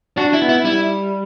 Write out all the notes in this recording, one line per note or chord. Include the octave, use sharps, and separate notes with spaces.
D4 F#4
E4
B3
E4
G3 E4